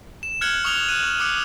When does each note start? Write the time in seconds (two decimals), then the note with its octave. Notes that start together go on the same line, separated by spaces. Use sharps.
0.23 E7
0.41 F6 F#6 G#6 C#7 F#7 G7
0.65 C#6 D#6 F#6 F7 G7
0.89 F#6 D#7
1.20 D6 D#6 F#6 C#7 D#7